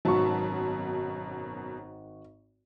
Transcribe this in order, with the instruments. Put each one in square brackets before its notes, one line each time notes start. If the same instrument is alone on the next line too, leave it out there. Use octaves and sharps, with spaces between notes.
[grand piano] G#1 F#4 C#6 [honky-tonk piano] F#2 B2 A5